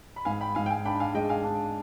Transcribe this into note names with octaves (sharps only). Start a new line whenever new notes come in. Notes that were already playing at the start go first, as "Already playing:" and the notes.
B5
G#2 F5 G#5
G5 B5
G#2 F5 G#5
G5
F5 G#5
D4 G5 B5
F5 G#5
G#3 D#5 G5
F5 G#5
D4